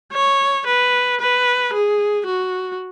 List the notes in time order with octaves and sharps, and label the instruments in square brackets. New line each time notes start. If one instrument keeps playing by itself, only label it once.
[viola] C#5
B4
B4
G#4
F#4